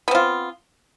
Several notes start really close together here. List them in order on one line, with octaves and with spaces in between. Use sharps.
B3 C4 F4